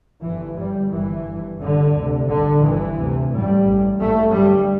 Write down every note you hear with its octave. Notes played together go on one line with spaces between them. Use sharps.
G1 G2 E3
G1 G2 G3
G1 G2 E3
G1 G2
G1 G2 D3
D2 C3
G1 G2 D3
G1 G2 E3
D2 C3
A1 G2 G3
A1 G2
A1 G2 A3
G1 G2 G3